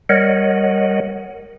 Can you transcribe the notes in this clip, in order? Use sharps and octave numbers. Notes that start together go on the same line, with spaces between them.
G3 A#4 C#5 D#5 F#5